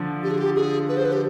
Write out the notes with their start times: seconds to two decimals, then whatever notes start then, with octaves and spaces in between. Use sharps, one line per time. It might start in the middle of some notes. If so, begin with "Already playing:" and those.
Already playing: D3 F3
0.23 G4
0.31 G#4
0.38 G4
0.56 G#4
0.89 B4
0.97 C5
1.05 B4
1.13 G4